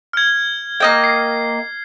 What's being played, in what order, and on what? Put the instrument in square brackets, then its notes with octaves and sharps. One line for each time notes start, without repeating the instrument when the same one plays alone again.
[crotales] F6 G#6
[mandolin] A#3 D#5 G5
[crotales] C7